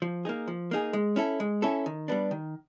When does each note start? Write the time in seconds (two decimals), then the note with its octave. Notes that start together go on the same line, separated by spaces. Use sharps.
0.02 F3
0.25 A#3 D#4 G#4
0.48 F3
0.71 A#3 D#4 G#4
0.93 G#3
1.16 C#4 E4 A4
1.40 G#3
1.62 C#4 E4 A4
1.86 D#3
2.08 G3 B3 D4
2.31 D#3